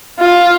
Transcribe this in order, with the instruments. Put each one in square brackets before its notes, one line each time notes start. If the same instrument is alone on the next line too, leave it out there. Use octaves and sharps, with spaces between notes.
[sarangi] F4